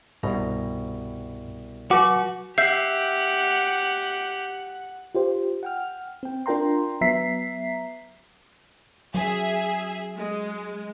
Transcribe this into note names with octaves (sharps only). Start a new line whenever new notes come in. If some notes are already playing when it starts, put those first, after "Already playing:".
C2 G2 B2 A#5
F#3 F#4 F#5 D6
G4 E5 F#5 G6 C7
F4 G4 C5
F#5 G5 F6
C4 G5
D4 F4 A#4 G5 A#5 C6
F#3 B3 E5 A#5 B6 C7
F#3 G#4 E5
G#3